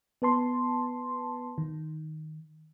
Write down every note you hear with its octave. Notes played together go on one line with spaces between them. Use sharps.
B3 B4 A5 C6
D#3